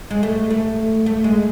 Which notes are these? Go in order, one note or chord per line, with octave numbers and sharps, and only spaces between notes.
G#3
A3
A3
A3
G#3